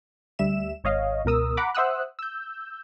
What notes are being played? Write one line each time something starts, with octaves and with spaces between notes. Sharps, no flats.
D2 G3 E5 E7
G#1 C#5 D#5 F5
C#2 B2 A#4 D#6 E6
F#5 A#5 B5 D6
C5 E5 F#5 D#6 E6 F#6
E6 G6